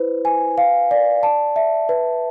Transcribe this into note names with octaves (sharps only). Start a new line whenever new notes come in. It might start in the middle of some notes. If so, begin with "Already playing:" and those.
Already playing: E4 B4 C5
G#5
F5
D5
A5
E5
B4